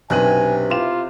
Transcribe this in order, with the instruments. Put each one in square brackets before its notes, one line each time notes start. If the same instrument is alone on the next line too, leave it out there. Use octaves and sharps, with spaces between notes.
[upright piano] B1 F#6 D#7 [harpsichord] G2 [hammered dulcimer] C3 [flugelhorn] G#5
[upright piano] E4 E7 [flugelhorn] F4 [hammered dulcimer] G4